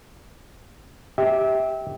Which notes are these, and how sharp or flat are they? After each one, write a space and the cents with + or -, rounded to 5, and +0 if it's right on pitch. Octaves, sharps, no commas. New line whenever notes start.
G4 +0 E5 -25